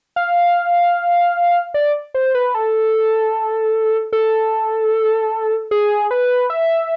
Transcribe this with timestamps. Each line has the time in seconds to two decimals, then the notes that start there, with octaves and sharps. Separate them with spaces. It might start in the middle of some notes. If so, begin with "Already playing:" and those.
0.16 F5
1.74 D5
2.14 C5
2.35 B4
2.55 A4
4.13 A4
5.71 G#4
6.11 B4
6.50 E5